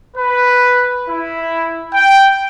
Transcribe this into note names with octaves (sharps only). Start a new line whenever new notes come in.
B4
E4
G5